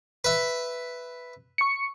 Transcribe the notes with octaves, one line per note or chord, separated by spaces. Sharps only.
B4 E5
C#6 C#7